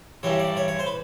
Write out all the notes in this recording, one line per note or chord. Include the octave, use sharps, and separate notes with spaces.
G2 E3 G3 C#5
D5
C#5
C#5
C5
B4